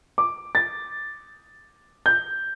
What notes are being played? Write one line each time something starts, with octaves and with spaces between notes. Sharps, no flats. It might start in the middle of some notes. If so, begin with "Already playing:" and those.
D6
A6
G6